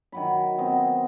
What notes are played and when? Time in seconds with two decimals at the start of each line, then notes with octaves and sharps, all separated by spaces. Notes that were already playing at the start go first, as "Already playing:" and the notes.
0.12 D#3 F#3 B5
0.58 B3 C4 D#5